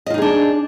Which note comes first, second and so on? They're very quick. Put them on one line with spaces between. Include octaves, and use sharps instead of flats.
D#5 F4 D#4 G#4 D4